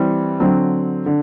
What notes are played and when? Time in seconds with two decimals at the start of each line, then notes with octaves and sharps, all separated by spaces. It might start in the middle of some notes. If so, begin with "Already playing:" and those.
Already playing: E3 G3 C4
0.40 D3 F#3 C4
1.06 D3